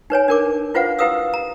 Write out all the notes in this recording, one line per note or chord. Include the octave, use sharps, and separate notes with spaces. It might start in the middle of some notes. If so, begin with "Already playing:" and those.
D#4 B4 C#5 G#5
D4 A#4 D6
E4 F4 B4 C5 F5 F#5
E4 G4 B4 F5 D#6 E6
A#5